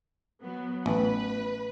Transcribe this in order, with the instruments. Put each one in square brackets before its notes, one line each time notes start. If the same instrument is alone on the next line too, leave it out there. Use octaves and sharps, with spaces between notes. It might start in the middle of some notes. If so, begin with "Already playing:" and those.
[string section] F#3 B3
[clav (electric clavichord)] A1 [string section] B4